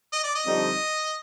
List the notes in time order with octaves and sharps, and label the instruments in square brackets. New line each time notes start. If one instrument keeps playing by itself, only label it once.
[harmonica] D#5
D5
D#5
[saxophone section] F2 D3 G3 C4 D#4